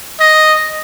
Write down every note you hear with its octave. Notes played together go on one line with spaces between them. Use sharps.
D#5